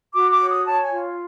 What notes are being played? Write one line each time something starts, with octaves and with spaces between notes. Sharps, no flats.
F#4 D6
D6
C#5
D#6
C#5 A5
G#5
F4